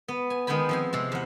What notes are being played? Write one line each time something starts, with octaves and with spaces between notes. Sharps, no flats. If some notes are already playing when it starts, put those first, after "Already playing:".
B3
G#5
D#3 G#3 B3 G5 G#5 B5
F3 C4 G#5
C3 G#3 C4
E2 F#5